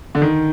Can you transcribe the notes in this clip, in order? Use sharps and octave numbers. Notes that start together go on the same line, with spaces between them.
D3
D#3